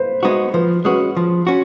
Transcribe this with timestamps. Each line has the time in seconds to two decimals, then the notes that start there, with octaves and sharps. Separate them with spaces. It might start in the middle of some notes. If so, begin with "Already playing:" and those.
Already playing: B4 C5
0.23 G#3 B3 D#4 F#4 C5
0.54 F3 B4
0.85 G#3 C#4 F#4 B4
1.17 F3
1.47 C#4 F#4